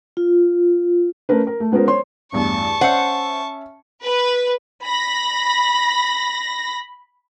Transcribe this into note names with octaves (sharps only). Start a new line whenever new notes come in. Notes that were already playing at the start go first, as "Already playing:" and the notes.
F4
A3 C#4 A#4 B4
A#4
A3
G#3 B3 C#4 F4 A#4 C5
C5 C#5 C6
A1 E2 G2 A5 C#6
C#4 C5 E5 F#5
B4
B5 A#6